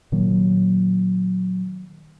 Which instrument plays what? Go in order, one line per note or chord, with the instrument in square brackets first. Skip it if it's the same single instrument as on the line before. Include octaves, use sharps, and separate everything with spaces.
[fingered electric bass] A#2 D#3 F#3 A#3